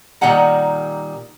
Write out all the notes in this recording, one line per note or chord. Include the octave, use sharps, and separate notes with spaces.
A#2 D#3 G3 D#4 F#5 A#5